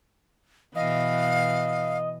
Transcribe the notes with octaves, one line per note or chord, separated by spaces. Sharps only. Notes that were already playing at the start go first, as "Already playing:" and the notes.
B2 E3 D#5 F5